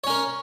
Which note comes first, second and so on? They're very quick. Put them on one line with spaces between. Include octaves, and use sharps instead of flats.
C#5 C#4 A#4